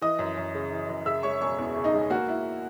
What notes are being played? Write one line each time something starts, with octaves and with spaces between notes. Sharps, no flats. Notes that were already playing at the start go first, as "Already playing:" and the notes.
E3 D#5 D#6
F#2
F#2
C#3
E3
F#2
C#3 E5 E6
G#3 C#5 C#6
E1 C#5 C#6
E2
C#3
D#4 D#5
G#3
A#3 F#4
E4